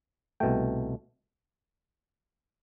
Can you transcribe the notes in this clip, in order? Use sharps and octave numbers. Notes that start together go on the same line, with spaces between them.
C2 B2 A3 G5